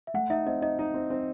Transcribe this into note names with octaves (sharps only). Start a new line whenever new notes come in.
E5
A3 F#5
D#4 E5
C4 D#5
D#4 D#5
D#4
C4
C4